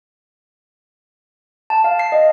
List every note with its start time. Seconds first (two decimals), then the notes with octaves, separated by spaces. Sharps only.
1.70 A5
1.84 F5
1.99 C7
2.12 D#5